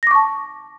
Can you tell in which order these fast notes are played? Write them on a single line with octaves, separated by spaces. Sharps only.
A#6 D6 C#6 A5